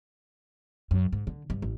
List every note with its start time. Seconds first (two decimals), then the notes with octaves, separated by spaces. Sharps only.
0.91 F#2
1.12 G#2
1.27 D3
1.50 G2
1.62 A1